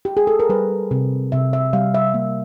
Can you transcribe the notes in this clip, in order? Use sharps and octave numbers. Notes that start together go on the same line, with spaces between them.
G4
G#4
A4
A#4
G3 B4
C3
C3 E5
E5
G3 F5
E5
A#3